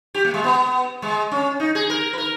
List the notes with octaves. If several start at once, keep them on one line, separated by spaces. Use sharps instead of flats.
G4
A#3
G#3
B3
G#3
C#4
D#4
G#4
A#4
B4
A#4